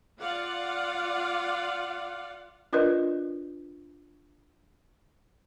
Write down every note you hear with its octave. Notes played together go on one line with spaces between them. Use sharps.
F4 D5 F5 F#5
D4 F4 A#4 B4 D5 D#5